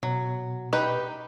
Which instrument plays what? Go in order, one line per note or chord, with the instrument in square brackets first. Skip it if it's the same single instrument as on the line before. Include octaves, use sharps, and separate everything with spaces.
[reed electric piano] B2 [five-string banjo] F#3
[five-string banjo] D#4 G4 B4